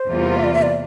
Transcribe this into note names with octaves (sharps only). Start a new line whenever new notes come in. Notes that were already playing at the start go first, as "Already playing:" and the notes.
Already playing: C5
E2 C3 G3 A#3 F4
E5
D5
E5
D5